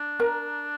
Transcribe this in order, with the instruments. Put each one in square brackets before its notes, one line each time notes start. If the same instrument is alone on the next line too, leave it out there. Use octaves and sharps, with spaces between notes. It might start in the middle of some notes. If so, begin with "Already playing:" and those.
Already playing: [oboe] D4
[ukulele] A#4